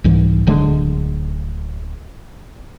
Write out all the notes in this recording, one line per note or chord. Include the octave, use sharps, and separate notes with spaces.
C2 G#2 E3
D1 D3 G#3